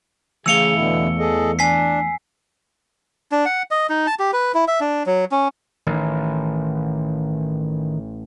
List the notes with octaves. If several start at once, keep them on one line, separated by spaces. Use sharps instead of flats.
C#3 E3 A3 F5 E6 C#7 G7
E2 B2 D3 E4
G#4 A4 D#5
D4 G#5 B6 C7
D4
F#5
D#5
D#4
A5
G4
B4
E4
E5
D4
F#3
C#4
A1 D#3